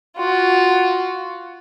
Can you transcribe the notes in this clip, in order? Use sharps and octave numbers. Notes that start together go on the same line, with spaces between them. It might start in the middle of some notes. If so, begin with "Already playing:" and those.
F4 F#4